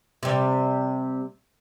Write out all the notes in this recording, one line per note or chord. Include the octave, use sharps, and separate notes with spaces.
C3 G3